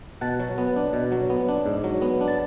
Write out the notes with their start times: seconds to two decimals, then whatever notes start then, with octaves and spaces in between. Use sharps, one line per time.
0.21 B2 F#5 A5
0.40 F#3
0.58 B3
0.76 D4
0.93 B2
1.12 F#3
1.30 B3
1.49 D4
1.66 G#2
1.84 F#3
2.02 B3
2.21 D4
2.28 A5